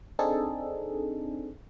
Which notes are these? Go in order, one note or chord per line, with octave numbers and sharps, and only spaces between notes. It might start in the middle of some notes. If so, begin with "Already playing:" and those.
C4 D4 D#4 G#4 A4